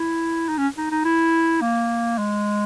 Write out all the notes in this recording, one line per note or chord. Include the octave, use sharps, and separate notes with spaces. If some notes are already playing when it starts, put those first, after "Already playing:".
Already playing: E4
D#4
C#4
D#4
D#4
E4
A#3
G#3